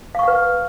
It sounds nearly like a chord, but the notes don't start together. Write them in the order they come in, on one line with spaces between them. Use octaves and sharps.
F5 C#6 F#5 B4